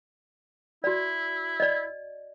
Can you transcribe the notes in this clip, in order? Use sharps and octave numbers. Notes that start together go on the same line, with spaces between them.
E4 F#4 D5
D5 D#5